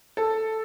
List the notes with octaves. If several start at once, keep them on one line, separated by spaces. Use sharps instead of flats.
A4